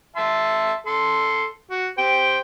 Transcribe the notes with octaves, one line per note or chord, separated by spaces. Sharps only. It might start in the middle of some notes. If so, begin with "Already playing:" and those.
E5 A5 C6
A4 C6
F#4
G4 C5 G5